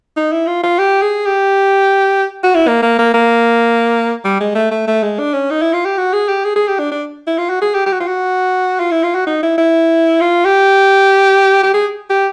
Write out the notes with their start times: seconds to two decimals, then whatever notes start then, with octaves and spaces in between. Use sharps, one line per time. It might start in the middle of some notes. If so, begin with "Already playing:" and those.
0.17 D#4
0.32 E4
0.47 F4
0.64 F4
0.79 G4
1.02 G#4
1.26 G4
2.44 F#4
2.55 E4
2.68 A#3
2.83 A#3
2.99 A#3
3.14 A#3
4.25 G3
4.41 G#3
4.55 A3
4.71 A3
4.87 A3
5.03 G#3
5.19 D4
5.34 C#4
5.51 D#4
5.62 E4
5.73 F4
5.85 G4
5.98 F#4
6.13 G#4
6.28 G4
6.45 G#4
6.56 G#4
6.68 G4
6.79 D4
6.92 D4
7.27 E4
7.38 F4
7.50 F#4
7.62 G#4
7.75 G4
7.86 G4
7.92 F#4
8.01 F4
8.08 F#4
8.80 F4
8.92 E4
9.03 F4
9.15 F#4
9.27 D#4
9.43 E4
9.58 E4
10.21 F4
10.45 G4
11.63 G4
11.74 G#4
12.10 G4